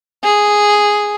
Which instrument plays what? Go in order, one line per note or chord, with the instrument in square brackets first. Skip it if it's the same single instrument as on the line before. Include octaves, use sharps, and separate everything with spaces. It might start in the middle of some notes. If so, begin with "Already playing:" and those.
[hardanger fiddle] G#4